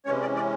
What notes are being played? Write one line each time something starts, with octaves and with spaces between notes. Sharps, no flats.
C3 E3 G#3 C#4 C#5
D5
D5